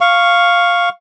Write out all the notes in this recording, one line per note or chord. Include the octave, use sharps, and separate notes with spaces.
F5 C#6